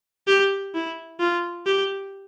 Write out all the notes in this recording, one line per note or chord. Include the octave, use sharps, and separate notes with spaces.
G4
E4
F4
G4